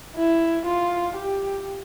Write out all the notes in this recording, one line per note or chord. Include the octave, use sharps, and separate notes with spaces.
E4
F4
G4